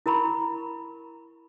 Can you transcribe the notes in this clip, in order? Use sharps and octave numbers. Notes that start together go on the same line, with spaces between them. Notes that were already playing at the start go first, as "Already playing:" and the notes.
E4 A#4 A#5 B5 C#6